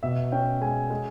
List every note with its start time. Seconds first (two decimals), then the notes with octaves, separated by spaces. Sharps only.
0.03 B2 E5
0.32 C#4 G5
0.61 G#3 G#5
0.90 G#3